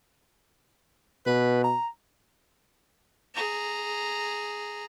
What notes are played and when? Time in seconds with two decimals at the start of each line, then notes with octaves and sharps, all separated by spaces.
1.26 B2 B4
1.64 A#5
3.35 G#4 A#5